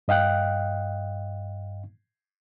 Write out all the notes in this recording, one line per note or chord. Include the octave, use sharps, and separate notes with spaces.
G2 D#5 F5 G5 F#6